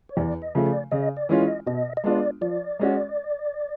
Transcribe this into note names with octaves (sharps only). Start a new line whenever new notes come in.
C#5
E2 D5
D#5
C#3 F3 A3
D5
C#3 D#5
D5
E3 G#3 C#4 F4
D#5
B2 D#5
D#5
G#3 B3 D4 F4 D5
F3 D5
G#3 C#4 F#4